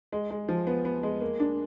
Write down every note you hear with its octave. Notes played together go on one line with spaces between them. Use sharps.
G#3
G#3
F3
B3
B3
G#3
A#3
D4